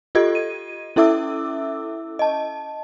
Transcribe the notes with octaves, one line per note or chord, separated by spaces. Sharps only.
F4 G4 A4 D#5 G#6
D#7
C#4 E4 A4 E5 D6 E6
D#5 A5